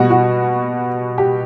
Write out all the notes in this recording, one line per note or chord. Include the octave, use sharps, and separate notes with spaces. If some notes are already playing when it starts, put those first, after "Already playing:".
Already playing: B2 G3 F#4
F#4
G4